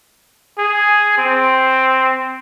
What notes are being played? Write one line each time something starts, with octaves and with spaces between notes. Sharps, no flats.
G#4
C4